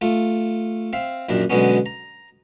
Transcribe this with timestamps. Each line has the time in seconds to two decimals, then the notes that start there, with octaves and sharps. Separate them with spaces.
0.01 A3 F4
0.93 C4 E5 F5
1.29 A#1 F#2 D#3 D4
1.50 B2 D3 F#3 G#3 B3 C#4
1.86 A#5